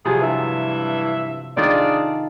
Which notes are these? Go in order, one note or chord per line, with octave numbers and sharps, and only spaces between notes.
C3 F3 F#3 G#4
G2 E3 E5
D#3 D4 F4 G#4 A4 D5